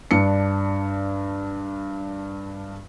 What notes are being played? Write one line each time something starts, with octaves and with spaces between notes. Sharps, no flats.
G2 D4 C#7